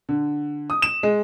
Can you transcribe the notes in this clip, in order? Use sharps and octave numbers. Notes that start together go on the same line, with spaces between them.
D3
D#6
E7
G#3